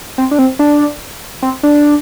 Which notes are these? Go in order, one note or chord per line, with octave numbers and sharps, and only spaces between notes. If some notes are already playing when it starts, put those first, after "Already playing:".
C4
D4
C4
D4
C4
D4